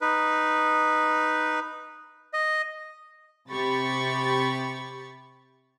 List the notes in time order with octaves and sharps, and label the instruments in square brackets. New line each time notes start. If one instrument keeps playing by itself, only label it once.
[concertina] D#4 B4
D#5
[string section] C3 G4 B5 C#6 A6